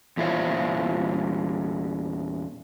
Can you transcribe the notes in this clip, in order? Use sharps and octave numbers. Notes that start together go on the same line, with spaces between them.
E2 A#2 E4 F4 C5 C#5